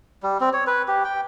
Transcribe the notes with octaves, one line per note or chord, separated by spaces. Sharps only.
G3
C4
C#5
B4
G4
G5